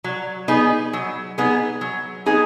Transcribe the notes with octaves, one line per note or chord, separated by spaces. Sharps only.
F#3
B3 D#4 G#4
F#3
B3 D#4 G#4
F#3
B3 D#4 G#4